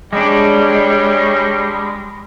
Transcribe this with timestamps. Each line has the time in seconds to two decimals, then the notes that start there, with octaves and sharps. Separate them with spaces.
0.13 G3 G#3 D4 C#5